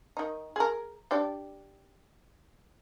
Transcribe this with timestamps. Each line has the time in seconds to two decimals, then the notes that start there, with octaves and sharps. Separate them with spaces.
0.17 D#3 D#4
0.56 G#4 A#4
1.11 D4 G4 D5